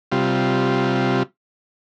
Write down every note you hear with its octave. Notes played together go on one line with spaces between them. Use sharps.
C3 G3 F4